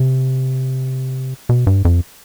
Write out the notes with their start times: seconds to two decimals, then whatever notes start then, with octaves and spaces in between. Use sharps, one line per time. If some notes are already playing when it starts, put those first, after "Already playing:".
Already playing: C3
1.49 B2
1.67 G2
1.85 F2